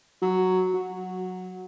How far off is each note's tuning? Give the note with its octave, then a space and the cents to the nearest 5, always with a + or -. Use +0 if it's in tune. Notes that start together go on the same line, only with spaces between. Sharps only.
F#3 +5
F#3 -10